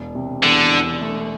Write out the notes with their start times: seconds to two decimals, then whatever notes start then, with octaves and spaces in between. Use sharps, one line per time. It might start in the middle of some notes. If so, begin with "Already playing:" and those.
Already playing: E1
0.15 C3
0.43 E2 D3
0.72 E1
1.01 A3